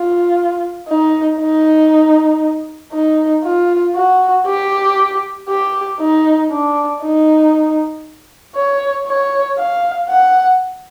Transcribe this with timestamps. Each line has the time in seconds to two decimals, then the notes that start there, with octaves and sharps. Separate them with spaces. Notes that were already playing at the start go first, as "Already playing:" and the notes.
Already playing: F4
0.88 D#4
1.40 D#4
2.93 D#4
3.44 F4
3.96 F#4
4.47 G4
5.49 G4
6.00 D#4
6.51 D4
7.02 D#4
8.56 C#5
9.07 C#5
9.58 F5
10.09 F#5